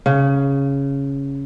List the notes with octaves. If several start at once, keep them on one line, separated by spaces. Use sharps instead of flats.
C#3